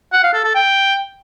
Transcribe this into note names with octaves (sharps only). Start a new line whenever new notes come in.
F#5
F5
A4
A4
G5